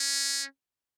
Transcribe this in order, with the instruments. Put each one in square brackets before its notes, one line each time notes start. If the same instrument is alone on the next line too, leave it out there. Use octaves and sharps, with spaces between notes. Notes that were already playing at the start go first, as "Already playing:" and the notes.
Already playing: [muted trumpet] C#4